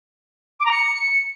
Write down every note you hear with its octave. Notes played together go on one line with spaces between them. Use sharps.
D6
A#5
C#7